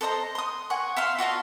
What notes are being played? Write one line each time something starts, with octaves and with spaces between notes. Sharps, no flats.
A4 C5 D#5 A#5
C6 D#6
F#5 G#5 C#6
E5 F5 C6
F4 F#4 D#5 A5